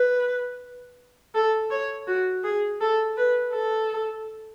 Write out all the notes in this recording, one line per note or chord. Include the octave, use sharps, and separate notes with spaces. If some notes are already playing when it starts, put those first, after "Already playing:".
Already playing: B4
A4
C#5
F#4
G#4
A4
B4
A4